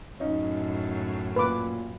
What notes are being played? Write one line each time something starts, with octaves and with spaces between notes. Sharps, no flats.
F#2 A2 C#4 D#4
A#2 B4 D6